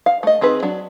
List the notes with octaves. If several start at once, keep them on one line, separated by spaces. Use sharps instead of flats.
F5
A3 D#5
D#3 C4 G#4 B4
F#3 D4